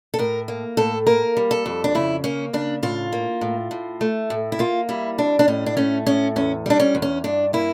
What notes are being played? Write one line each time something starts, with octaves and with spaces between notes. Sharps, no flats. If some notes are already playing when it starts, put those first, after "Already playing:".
A4
A2 A#4
A#3
A2 A4
A#3 A#4
G3
A4
F2
D4
C#3 E4
A#3 C#4
C#3 D4
A2 F4
A#3
A2
A2
A3
A2
E4
A#3 F4
G3 E4
F2 D4
D4
A2 C#4
D4
A3 C#4
A2 C#4
E2 C#4
G3 D4
C#4
E2
C#4
G2 D4
A#3 E4